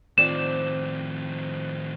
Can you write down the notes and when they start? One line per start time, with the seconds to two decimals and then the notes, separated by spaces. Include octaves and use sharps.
0.18 A2 D#3 F3 C4 D5 E7